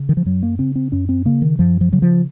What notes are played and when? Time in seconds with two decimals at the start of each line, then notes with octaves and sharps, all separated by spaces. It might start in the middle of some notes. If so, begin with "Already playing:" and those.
Already playing: C#3
0.09 D#3
0.17 F3
0.26 F#2 F#3
0.43 A#3
0.59 C#3 C4
0.76 C4
0.92 F#2 C#4
1.09 C4
1.25 C#3 A#3
1.42 D#3
1.59 F#2 F3
1.81 F3
1.92 C#3 F#3
2.02 F3